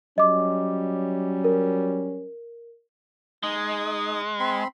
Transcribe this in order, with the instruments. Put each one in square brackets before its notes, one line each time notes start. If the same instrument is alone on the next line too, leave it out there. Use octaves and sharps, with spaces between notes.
[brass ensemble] F#3 G3 C#4 [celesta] D#5 D6
[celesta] A#4
[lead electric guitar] G#3 [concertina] D#4 D#6
[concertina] C4 B5 C6